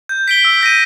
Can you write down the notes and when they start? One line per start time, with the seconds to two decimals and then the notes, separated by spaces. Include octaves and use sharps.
0.09 G6
0.28 B6 D7 G7
0.45 E6
0.61 G6 A#6 D#7